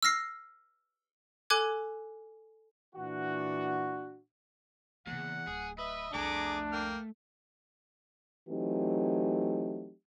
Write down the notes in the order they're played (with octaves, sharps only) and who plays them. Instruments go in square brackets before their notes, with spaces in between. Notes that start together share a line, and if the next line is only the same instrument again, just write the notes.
[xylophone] E6 F6 A#6 C7
A4 G#5 D6 F#6 G#6
[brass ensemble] A#2 E3 D4 F#4
[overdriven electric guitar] E2 [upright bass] C#3 A#3 [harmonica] F#5
[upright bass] D1 [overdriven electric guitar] G#4
[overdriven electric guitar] B4 [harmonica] D#5 E5
[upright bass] C2 F2 [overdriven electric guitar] A3 [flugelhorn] D4 [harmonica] G#4 A#5 D6
[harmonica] A#3 G5 F6
[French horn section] E3 F#3 A3 C4 D#4 G4